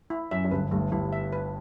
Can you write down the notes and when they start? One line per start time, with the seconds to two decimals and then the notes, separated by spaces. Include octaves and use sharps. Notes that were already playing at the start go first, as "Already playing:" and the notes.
0.10 E4
0.31 F#2 E5
0.45 F#2
0.51 G1 G2 B4
0.71 G1 G2 A3
0.91 G1 G2 E4
1.13 E5
1.33 B4